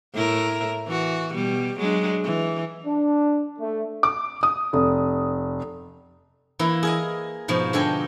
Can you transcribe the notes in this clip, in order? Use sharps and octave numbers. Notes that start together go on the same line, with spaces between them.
A2 E4 A#4
E3 F#4
B2 G3
F#3 G#3 D4
E3
D4
A3
D6
D#6
F1
E3 A#3 E4
G#4 A#4 D#5
G#2 B2 F3
D3 G#3 A4 G5 G#5